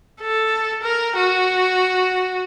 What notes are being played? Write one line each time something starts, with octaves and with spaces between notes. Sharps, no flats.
A4
A#4
F#4